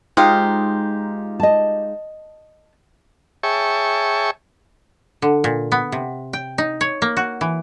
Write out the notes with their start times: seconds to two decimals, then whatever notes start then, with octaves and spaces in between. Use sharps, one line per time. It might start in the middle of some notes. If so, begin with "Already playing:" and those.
0.17 G#3 D#4 F4 G4 C5 F5
1.40 D#5 A5
3.43 G#4 C#5 E5 G5 A5 C#6
5.22 D3
5.44 A#2
5.72 B3
5.92 C3
6.33 G5
6.58 D#4
6.81 C#5
7.02 A#3
7.17 F#4
7.41 E3